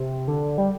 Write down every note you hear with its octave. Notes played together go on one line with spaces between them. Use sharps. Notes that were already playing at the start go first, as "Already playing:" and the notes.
Already playing: C3
D3
G3